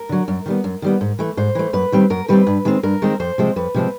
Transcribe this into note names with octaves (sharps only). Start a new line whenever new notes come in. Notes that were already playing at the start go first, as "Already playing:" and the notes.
Already playing: A#4
D3 F#3
F#2
D#3 G3 B3
F#2
D#3 G3 B3
G#2
E3 A3
G#2 C5
E3 A3
F#2 B4
D#3 G3 C4
F#2 A#4
D#3 G3 C4 B4
G2
D#3 G#3 C4
G2 A#4
D#3 G#3 C4
F2 C5
C3 F3 G#3 C4
F2 B4
C3 F3 G#3 C4